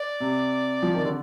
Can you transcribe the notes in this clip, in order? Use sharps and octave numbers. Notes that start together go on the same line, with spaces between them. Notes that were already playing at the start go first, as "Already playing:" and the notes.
Already playing: D5
C3
F3
D#3
D3 D5